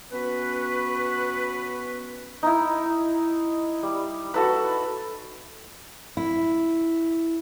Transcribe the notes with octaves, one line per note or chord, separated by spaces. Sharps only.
B3 C#4 F#4 B4
D#4 E4
G3
F#4 A4 B4
E4